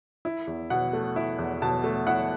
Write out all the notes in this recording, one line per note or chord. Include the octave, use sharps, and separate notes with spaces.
E4
E2
B2 F#5
A3
E4
E2
B2 A5
A3
E4 F#5